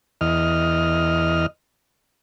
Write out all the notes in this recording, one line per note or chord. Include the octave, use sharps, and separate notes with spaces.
E2 D#5 F6